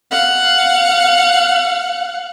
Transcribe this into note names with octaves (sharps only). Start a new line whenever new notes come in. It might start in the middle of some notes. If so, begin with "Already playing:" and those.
F5 F#5